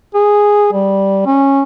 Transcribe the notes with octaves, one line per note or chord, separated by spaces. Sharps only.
G#4
G3
C#4